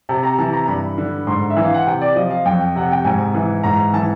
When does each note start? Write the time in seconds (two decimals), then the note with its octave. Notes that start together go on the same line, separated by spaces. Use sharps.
0.09 C3 A5
0.23 A#5
0.38 E3 A5
0.53 A#5
0.68 G2 B5
0.98 D3
1.27 G#2 C6
1.50 E5
1.57 E3
1.63 F5
1.74 F#5
1.86 C3 G5
2.01 D5
2.16 F3 D#5
2.31 F5
2.45 F2 G5
2.76 C3 F#5
2.91 G5
3.04 G#2 G#5
3.35 E3
3.64 G#2 A#5
3.94 E3 A5